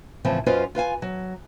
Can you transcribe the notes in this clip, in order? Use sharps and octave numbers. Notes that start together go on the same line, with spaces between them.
A2 C#3 E3 F3 C4
F#2 C#4 F4 B4 C5 D#5
F4 B4 F5 G#5
F#3